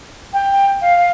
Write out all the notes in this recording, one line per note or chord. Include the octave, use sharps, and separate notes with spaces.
G5
F5